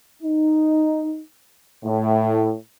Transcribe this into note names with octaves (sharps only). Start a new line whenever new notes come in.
D#4
A2